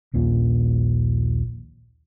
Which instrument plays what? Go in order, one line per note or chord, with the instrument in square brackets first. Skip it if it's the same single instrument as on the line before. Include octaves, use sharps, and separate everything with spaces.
[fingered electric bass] A#1 D#2 A#2